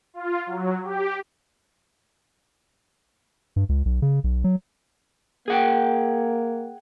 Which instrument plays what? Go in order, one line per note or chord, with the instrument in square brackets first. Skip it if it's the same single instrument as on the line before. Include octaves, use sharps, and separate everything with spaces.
[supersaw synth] F4
F#3
G4
[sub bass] G2
C#2
B1
C#3
B1
F#3
[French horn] A#3 [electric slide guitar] G#4 F#5 G5